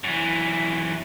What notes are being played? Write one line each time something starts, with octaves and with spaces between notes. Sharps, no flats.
F#2 E3